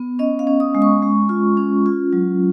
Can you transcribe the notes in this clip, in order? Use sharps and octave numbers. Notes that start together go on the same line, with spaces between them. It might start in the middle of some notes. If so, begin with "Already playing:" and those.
Already playing: B3
C#4 D#5
F5
C#4
D#6
G#3
C#6
G#3
F4
C#4
F4
F#3